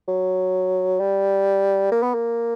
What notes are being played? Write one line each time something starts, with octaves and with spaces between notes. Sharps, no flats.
F#3
G3
A#3
B3
A#3